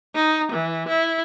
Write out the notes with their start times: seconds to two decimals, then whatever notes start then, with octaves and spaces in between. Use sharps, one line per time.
0.15 D#4
0.52 E3
0.88 E4